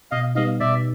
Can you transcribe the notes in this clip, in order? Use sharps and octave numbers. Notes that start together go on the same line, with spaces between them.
B2 D#5 F5
G3 B3 D#4 D#5 F5
B2 D5 E5